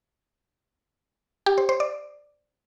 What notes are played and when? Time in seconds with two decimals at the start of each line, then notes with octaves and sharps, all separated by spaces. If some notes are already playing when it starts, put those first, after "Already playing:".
1.46 G4
1.58 C5
1.69 C5
1.80 D5